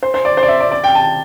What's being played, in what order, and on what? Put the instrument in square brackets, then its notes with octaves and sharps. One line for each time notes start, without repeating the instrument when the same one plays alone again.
[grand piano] C5
C5
D5
C5
D5
E5
D5
D5
G5
A5